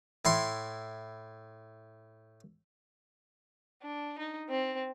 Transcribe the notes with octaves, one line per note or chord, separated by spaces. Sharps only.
A2 E4 C6
D4
D#4
C4